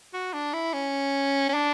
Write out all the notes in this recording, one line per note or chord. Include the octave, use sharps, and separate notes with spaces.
F#4
D4
E4
C#4
C#4
D4